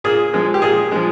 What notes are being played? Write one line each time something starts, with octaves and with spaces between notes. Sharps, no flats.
A#2 G#4
F3 G#3
G4
A#2 G#4
F3 G#3